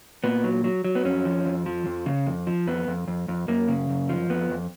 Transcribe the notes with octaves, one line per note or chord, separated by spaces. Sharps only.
A#2 B3
F#3
F#3
F#3
B3
F2 C#4
F3
F2
F3
F2
C#3
F2
F3
F2 B3
F2
F2
F2
F#2 A#3
C#3
F#2
F3
F2 B3
F2